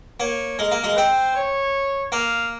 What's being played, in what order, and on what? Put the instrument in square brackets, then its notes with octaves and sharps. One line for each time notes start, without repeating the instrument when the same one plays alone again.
[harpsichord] A#3 [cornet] C#5
[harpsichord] G#3 [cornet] A#4
[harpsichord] A#3
G#3
[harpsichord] C4 [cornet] C5
[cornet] C#5
[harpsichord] A#3 [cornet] F5